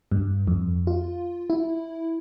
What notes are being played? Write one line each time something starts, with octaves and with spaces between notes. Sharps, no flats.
G2
F2
F4
E4